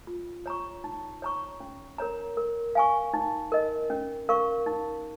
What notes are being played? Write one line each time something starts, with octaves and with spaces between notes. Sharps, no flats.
F4
C#5 A#5 C#6
D#4
C#5 A#5 C#6
C#4
A#4 C#5 A#5
A#4
F5 G#5 C#6
D#4
A#4 D#5
C#4
A#4 F5 C#6
D#4